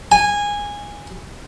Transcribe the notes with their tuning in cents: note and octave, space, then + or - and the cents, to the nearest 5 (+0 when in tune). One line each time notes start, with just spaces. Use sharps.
G#5 -15